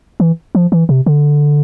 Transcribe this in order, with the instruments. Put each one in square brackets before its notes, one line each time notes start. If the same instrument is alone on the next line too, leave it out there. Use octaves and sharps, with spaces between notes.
[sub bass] E3
F3
E3
C3
D3